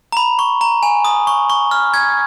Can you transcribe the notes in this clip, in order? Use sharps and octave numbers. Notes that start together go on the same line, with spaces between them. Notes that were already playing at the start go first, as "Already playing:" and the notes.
A#5
B5
C#6
A#5
G#5
D#6
C#6
C#6
F6
G#6